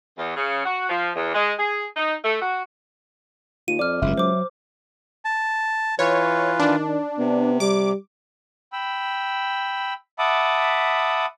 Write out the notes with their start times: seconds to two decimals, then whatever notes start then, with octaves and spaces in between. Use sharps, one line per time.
0.18 E2
0.37 C#3
0.66 F#4
0.90 F3
1.15 E2
1.35 G#3
1.59 G#4
1.97 D#4
2.24 A3
2.42 F#4
3.68 D#2 F4 D#7
3.79 F2 D5 D6 F6
4.02 F#1 C#2 G2 E5
4.18 F#3 C5 D6
5.25 A5
5.99 E3 F4 B4 C#5
6.60 D#3 D4
7.19 C3 B3
7.60 G3 D6
8.73 G5 B5 E6
10.19 E5 F#5 A5 B5 D6 D#6